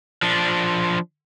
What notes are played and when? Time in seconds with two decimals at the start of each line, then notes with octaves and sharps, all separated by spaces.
0.23 F3 D4